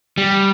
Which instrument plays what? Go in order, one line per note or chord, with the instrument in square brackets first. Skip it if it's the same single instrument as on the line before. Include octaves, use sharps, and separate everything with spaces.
[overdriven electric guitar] G3